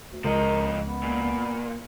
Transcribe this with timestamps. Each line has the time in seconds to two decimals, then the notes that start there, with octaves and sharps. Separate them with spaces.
0.12 D2
0.24 C#2 F3 A#4 D#5
0.87 B3
1.03 A#2